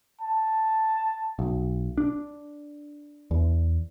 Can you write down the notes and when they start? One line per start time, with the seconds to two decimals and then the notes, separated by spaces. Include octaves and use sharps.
0.21 A5
1.39 B1
1.98 D4
3.31 E2